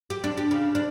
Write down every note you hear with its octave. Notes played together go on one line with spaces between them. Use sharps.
G4
D4
G4
C#3
D4